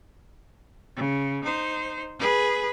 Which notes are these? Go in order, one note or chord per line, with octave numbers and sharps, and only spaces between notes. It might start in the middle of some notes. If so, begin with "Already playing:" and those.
C#3
D#4 C5
G#4 B4